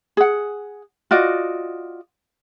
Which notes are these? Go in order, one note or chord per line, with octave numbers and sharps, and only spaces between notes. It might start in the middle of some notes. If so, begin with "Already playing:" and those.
G#4 F#5
F4 F#4 D5 D#5